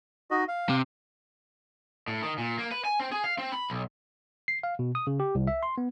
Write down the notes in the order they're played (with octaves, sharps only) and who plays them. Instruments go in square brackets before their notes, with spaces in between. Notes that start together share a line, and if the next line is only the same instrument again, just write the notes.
[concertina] D#4 F#4 D#5
F5
[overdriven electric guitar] C3
A2
D#3
A#2
A#3
B4
G#5
C4
G#4
F5
C4
B5
B1
[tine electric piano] C7
F5
B2
D#6
C#3
G4
C2
E5
C6
B3